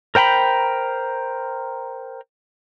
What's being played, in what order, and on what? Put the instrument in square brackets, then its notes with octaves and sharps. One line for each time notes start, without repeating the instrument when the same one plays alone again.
[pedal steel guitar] A#4 C5 G5 A#5 B5